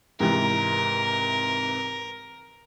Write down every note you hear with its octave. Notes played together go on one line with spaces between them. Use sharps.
G#2 C3 E3 A#4